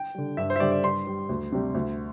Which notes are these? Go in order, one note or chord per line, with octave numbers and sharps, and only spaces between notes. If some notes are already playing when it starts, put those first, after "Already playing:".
Already playing: G5
D3 G3
G2 E5
C5
E5
D3 G3 D5
D5
G2 C6
G3
D2
C3 G3
D2